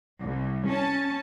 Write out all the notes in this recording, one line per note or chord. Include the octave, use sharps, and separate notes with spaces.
C2
C#4 A5